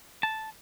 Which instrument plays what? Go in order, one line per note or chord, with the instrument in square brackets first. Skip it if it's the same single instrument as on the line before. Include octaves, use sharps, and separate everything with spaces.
[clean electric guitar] A5